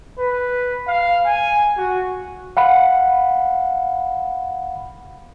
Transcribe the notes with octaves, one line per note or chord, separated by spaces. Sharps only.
B4
F5
G#5
F#4
F5 F#5 B5